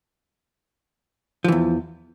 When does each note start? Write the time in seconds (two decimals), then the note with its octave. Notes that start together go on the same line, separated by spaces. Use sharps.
1.44 F3
1.48 E3
1.52 E2